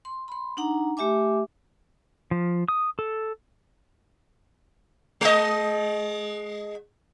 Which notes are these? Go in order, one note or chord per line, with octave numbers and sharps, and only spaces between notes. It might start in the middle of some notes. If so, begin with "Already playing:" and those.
C6
B5 C6
D4 D#4 F#5 A#5
A3 G4 E5 G#5 D6
F3
D#6
A4
G#3 D#5